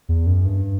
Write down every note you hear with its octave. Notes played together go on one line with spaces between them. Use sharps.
E2
F#2
G2